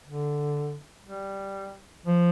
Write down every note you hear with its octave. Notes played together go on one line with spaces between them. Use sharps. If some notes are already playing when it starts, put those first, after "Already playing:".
D3
G3
F3